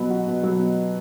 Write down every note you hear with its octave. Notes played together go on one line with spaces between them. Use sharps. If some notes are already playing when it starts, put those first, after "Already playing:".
Already playing: B2 F#3 B3 F#4
F#4
B2
F#3
B3